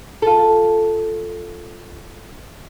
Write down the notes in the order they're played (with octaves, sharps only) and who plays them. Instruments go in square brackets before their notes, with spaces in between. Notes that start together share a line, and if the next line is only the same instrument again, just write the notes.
[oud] F4 A4